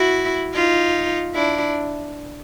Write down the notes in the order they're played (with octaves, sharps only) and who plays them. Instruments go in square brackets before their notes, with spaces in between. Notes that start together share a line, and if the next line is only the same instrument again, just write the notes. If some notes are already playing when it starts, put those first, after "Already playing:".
Already playing: [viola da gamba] E4 F#4
D#4 F4
D4 E4